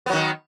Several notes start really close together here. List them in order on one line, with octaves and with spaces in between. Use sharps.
B3 F#3 D#3